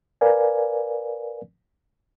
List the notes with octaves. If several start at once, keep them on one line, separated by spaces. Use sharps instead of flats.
A#4 B4 D5 F5 G#5